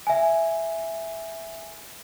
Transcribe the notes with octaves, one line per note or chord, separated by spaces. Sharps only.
E5 G#5